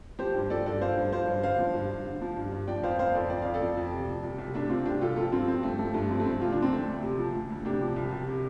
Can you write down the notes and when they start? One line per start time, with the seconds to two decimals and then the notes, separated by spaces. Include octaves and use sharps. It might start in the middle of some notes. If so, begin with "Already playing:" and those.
0.19 F3 G4 C5
0.34 G2
0.50 F3 A4 D5
0.66 G2 A4 D5
0.81 F3 C5 F5
0.96 G2
1.12 F3 C5 F5
1.27 G2
1.43 D3 C5 F5
1.59 F3
1.75 G2
1.90 G2
2.06 D3
2.21 F3
2.37 G2
2.52 G2
2.68 F3 D5 G5
2.83 F2 C5 F5
2.99 F3 C5 F5
3.15 F2 A4 D5
3.30 F3 D5
3.42 F2 F5
3.54 A4 D5
3.61 F3
3.77 F2
3.93 C3
4.08 F3
4.23 C2
4.38 C2
4.54 C3 A3 D4
4.69 F3 C4 F4
4.85 C2 D4 G4
5.01 C2 F4 A4
5.16 F3 F4 A4
5.32 G2 C4 F4
5.48 F3 C4
5.63 G2 A3
5.78 F3 A3
5.94 G2 A3
6.10 F3 C4
6.20 A3
6.25 G2 C4
6.41 C3 F4
6.52 F3 D4
6.62 C4
6.73 D2 A3 D4
6.88 D2
7.03 C3
7.19 F3
7.35 D2
7.50 D2
7.65 C3 D4 G4
7.81 F3
7.96 C2
8.12 C2
8.28 C3